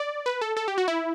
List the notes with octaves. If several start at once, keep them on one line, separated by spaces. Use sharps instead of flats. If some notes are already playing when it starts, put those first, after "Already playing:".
Already playing: D5
B4
A4
A4
G4
F#4
E4